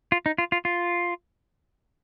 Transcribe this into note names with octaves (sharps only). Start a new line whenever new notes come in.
F4
D#4
F4
F4
F4